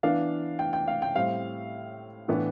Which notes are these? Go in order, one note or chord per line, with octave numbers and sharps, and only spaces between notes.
E3 B3 D4 F5
G5
G5
F5
G5
A2 G3 C4 F5
A2 E3 B3 D4